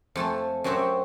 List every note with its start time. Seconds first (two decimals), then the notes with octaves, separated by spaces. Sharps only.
0.16 F2 A3 A4 G#5
0.64 F#2 F#3 C4 F#4 G4 E5